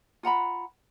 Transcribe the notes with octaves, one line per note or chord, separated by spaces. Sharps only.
F4 F#5 A#5 B5